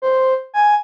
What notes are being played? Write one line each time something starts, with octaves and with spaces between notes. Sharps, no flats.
C5
G#5